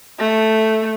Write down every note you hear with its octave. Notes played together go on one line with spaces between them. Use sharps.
A3